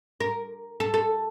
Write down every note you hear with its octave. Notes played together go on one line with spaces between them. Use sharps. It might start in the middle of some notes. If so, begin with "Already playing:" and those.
A#4
A4
A4